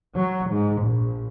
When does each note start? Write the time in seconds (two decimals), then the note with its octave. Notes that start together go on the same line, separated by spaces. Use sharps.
0.15 F#3
0.50 G#2
0.81 A#1